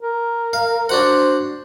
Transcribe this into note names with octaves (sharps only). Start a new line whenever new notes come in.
A#4
F5
D4 F#4 C5 F#5